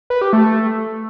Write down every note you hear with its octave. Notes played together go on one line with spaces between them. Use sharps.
B4
G4
A3